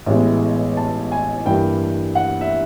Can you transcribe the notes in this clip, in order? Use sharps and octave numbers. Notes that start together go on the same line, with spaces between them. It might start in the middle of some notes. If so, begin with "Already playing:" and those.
A1 A2 E3 G#3 B3
A5
G#5
G2 E3 G3 A#3 D4 G5
F#5
E5